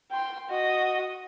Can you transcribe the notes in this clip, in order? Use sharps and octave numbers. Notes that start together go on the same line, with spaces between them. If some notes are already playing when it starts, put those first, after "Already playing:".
G5 C6
F#4 D#5